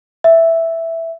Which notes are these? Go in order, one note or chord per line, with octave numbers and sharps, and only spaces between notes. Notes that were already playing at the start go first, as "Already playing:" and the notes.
E5